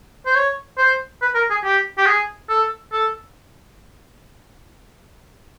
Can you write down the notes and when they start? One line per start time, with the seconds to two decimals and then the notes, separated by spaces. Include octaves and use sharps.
0.26 C5
0.35 C#5
0.78 C5
1.22 B4
1.35 A#4
1.50 G#4
1.64 G4
1.98 G4
2.06 G#4
2.49 A4
2.92 A4